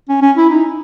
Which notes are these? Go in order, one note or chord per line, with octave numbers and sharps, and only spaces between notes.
C#4
C#4
E4
D#4